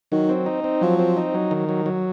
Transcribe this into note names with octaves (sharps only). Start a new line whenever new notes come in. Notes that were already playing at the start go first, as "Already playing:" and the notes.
D#3 F#3
C4
D#4
C4
F3 F#3
C4
D#4
F#3
D#3
F#3
F#3